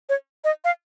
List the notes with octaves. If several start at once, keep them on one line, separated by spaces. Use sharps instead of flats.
C#5
D#5
F5